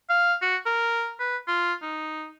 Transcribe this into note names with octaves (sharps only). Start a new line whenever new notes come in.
F5
F#4
A#4
B4
F4
D#4